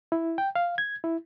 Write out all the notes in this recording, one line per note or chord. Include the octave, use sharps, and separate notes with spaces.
E4
G5
F5
G#6
E4